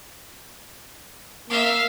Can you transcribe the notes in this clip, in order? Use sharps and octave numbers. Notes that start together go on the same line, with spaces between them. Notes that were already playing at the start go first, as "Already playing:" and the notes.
A#3 E5 F5